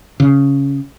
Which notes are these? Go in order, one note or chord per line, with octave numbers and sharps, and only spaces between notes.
C#3